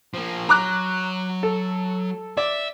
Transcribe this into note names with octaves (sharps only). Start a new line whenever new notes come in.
F3 A#3
F#3 A#5 D6 F#6
A4
D5 E5